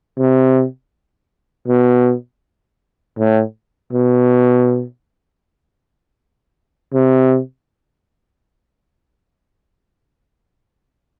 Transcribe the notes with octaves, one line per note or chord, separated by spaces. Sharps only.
C3
B2
A2
B2
C3